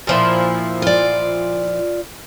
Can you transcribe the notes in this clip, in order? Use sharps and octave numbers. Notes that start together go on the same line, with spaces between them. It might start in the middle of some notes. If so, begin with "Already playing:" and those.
A#2 F3 E4
F4 D5